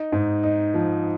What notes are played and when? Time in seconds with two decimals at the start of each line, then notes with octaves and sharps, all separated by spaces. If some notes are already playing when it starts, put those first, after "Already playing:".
Already playing: D#4
0.12 G#2
0.43 D#4
0.74 F3